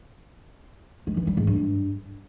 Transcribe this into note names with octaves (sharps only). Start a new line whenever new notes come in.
G#3
E3
G3
G#2
G2